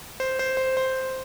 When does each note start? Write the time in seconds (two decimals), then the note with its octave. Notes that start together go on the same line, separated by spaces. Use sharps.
0.20 C5
0.39 C5
0.57 C5
0.77 C5